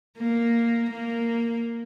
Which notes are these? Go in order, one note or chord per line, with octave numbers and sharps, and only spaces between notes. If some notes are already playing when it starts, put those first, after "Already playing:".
A#3
A#3